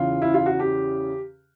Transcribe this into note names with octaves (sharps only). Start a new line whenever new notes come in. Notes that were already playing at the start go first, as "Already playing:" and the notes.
Already playing: E2 C#3 E3 F4
E4
F4
F#4
G4